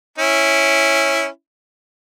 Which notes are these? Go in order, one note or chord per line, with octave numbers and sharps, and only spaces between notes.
C#4 E4